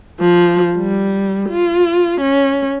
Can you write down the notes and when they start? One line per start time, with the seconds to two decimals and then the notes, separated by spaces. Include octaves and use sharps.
0.20 F3
0.77 G3
1.50 F4
2.21 C#4